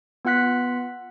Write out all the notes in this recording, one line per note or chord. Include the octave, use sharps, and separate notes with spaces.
B3 F4 F#5 F#6 B6